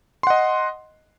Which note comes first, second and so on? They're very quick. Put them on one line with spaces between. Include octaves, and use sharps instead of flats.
C6 F#5 D#5